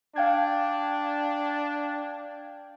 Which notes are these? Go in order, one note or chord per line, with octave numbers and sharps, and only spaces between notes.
D4 F5 G5 G#6